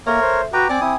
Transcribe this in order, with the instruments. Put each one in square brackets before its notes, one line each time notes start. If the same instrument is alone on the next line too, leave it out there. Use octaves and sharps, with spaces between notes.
[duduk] A#3 [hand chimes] A4 E5 [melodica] A#4 C#5
[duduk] C5
[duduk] F#4 [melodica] B4 G5 A#5 [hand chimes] D6
[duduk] C4 [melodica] D5 D6 [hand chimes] G5 G#5 G#6
[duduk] C4 [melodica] E4 D#6